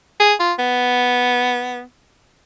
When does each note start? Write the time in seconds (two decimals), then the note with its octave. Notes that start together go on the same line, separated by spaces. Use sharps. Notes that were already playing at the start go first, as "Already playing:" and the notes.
0.20 G#4
0.40 F4
0.59 B3